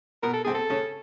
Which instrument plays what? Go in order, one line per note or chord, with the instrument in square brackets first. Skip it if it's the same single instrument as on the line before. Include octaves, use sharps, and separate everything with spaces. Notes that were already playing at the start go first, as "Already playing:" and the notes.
[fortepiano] B2 B3 [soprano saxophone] A#4
[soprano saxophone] A4
[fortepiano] C3 C4 [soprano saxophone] G#4
[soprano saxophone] A4
[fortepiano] C#3 C#4